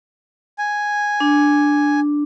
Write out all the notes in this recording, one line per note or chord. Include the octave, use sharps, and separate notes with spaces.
G#5
D4